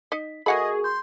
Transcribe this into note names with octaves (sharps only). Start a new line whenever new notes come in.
D#4 D#5 B6
A3 F#4 G#4 A#4 D#5 F#5 B5 C#6
C6 G6